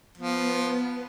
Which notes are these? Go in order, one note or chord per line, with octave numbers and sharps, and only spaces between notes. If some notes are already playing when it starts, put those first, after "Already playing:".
F3 B3